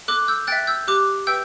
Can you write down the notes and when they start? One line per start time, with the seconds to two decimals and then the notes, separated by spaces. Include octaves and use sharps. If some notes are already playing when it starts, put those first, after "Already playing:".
0.08 A4 D6 F#6
0.28 E6 G6
0.47 E5 G5 F#6 A6
0.67 E6 G6
0.88 G4 D6 F#6
1.27 B4 E5 G5 E6 G6